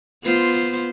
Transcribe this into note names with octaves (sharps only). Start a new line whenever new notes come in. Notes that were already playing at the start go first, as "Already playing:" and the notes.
B3 F4 C5